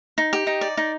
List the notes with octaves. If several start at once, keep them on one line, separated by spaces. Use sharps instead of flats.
D#4
G4
D#4
D5
D#4